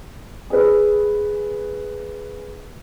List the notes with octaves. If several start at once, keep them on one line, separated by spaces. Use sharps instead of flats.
G#4 B4